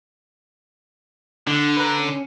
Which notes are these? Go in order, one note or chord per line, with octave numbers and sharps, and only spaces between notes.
D3 D4
B4 A#5
C#4